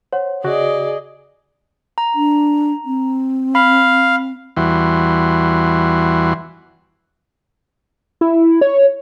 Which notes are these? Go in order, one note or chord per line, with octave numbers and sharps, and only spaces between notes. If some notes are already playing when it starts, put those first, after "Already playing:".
C5 C#5 F#5
C#3 F#4 G#4 D5 D#5
A#5
D4
C4
F5 B5
E2 E3 G3 F#4 C6
E4
C#5